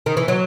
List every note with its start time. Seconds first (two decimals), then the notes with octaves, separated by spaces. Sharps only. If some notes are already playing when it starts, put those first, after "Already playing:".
0.06 D#3
0.17 E3
0.28 F#3